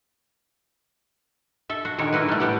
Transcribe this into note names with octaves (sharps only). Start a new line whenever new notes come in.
A4 E5
F#4
A#2 D3 D#3 C#5
A#3 E4 F#4 B4
G3 A3
A2 G3 B3 G4 F#5